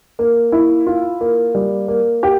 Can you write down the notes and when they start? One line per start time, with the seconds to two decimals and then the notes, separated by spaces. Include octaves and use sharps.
0.19 A#3
0.52 E4
0.87 F4
1.21 A#3
1.55 G3
1.88 A#3
2.23 G4